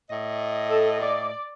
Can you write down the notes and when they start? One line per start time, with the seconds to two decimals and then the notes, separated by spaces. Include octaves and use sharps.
0.10 A2 D#5
0.69 A4
1.00 D5